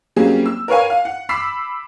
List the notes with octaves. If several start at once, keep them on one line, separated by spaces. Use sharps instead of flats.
F#3 G3 A#3 C4 C#4 G#4
E6
A#4 B4 C#5 F5 G#5
F5
F#5
B5 D6 E6 B6 C7